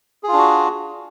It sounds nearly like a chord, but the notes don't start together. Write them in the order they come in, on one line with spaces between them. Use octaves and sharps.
G#4 F4 D4 F#4